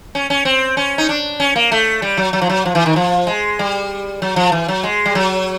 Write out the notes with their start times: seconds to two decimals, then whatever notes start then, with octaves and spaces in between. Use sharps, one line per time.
0.15 C#4
0.30 C#4
0.45 C4
0.77 C#4
0.98 D#4
1.09 D4
1.40 C#4
1.56 A#3
1.72 A3
2.02 G3
2.17 F#3
2.33 F#3
2.42 F3
2.49 F#3
2.65 F3
2.75 E3
2.86 D#3
2.96 F3
3.27 G#3
3.59 G3
4.22 F#3
4.36 F3
4.52 E3
4.68 F#3
4.83 G#3
5.06 G3
5.15 F#3